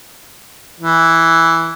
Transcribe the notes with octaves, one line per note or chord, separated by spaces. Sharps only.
E3